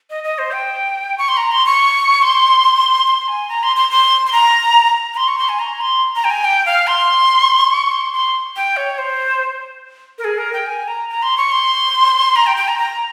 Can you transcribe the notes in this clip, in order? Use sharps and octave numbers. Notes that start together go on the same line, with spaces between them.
D#5
D#5
C5
G5
C#6
C6
A#5
C6
C#6
C6
C6
G#5
A#5
C6
C6
C6
C6
A#5
A#5
C6
C#6
C6
G#5
A#5
C6
A#5
G5
G#5
G5
F5
C6
C#6
C6
C6
G5
C#5
C5
A#4
G#4
A#4
G5
G#5
A#5
A#5
C6
C#6
C6
A#5
G5
G5
A#5
A#5